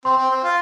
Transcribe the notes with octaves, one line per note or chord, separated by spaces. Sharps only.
C4 C6
C4
C4
F4